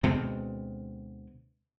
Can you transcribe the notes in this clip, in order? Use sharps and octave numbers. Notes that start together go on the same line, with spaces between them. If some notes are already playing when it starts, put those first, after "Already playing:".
D2 B2 G#3 C4